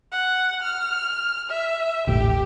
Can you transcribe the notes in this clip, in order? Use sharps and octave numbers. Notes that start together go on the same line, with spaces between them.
F#5
F6
E5
D#1 A1 G4